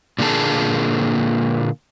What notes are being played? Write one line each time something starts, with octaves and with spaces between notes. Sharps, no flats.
A#2 D3 A#3 G#4 A5